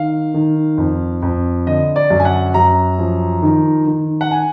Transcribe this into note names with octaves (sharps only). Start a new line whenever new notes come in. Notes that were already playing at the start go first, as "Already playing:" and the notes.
Already playing: D#3 F5
D#3
F2
F2
D3 D#5
D5
F#2
G#5
F#5
F#2 A#5
F3
D#3
D#3
F#5
G#5